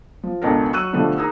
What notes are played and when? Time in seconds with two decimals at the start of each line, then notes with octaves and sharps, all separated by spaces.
0.23 F3
0.42 C#2 B2 B3 D4 A4 A#4
0.73 F#3 C#6 E6 F#6 D#7
0.93 B2 D3 F3 G3 A3
1.18 D#4 G#4 A#4 A#5 E6